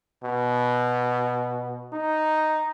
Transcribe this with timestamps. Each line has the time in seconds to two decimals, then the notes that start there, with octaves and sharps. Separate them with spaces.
0.24 B2
1.93 D#4